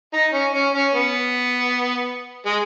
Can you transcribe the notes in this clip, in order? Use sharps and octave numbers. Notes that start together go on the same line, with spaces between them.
D#4
C#4
C#4
C#4
B3
G#3